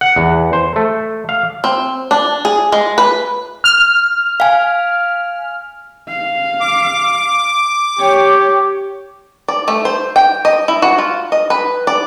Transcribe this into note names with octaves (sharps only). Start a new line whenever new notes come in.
F#5
E2
C5
A3
F5
C4
D4
G#4
G#3
B4
F6
F5 G#5
F5
D6
G4 C#5
D5
A3
C5
G5
D#5
E4
F#4
F4
D#5
B4
D5